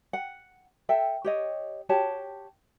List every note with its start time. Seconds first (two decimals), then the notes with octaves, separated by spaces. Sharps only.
0.13 F#5
0.89 A4 E5 G5
1.24 G4 C#5 D#5
1.89 F#4 G4 C#5 A5